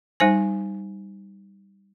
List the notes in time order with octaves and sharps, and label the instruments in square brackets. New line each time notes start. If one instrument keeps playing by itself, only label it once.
[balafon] G3 D#4 C5 G#5